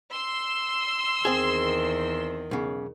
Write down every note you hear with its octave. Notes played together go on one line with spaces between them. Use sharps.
C6 E6
E2 D#3 C4 G#4
B1 C#3